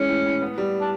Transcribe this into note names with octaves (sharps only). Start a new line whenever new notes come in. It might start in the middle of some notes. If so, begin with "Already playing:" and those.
Already playing: E3 G#3 C#4
A2
A2
B3
G3
D4